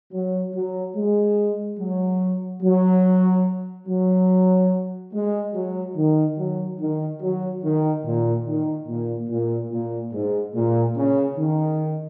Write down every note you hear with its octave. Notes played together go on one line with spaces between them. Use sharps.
F#3
F#3
G#3
F#3
F#3
F#3
G#3
F#3
D#3
F#3
D#3
F#3
D#3
A#2
D#3
A#2
A#2
A#2
G#2
A#2
C#3
D#3